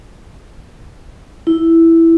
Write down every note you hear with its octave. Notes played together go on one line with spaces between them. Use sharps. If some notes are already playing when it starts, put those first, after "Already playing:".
E4